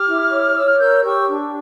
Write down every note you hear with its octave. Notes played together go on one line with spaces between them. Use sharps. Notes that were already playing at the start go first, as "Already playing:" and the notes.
Already playing: G4 D6 F6
E4
C#5
C#5 E6
F6
A#4 E6 G6
G4 C#6 E6
D4